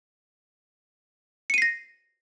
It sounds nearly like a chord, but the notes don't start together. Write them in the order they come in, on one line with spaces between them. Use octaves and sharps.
C#7 D#7 C7 A#6